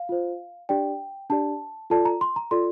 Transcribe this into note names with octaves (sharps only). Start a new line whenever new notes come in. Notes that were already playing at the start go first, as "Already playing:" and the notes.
Already playing: F5
F4 C5
D4 G4 D5 G5
D4 G4 D5 A5
F4 A4 D5 A5
A#5
C6
A#5
F4 A4 D5 C6